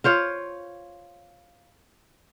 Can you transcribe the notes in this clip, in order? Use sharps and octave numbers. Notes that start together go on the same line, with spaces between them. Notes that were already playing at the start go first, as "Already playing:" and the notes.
F4 C5 C#5 F5